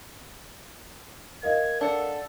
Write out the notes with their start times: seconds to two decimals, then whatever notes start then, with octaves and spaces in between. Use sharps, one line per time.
1.43 A#4 D#5 F5 G#6
1.81 D4 A4 F#5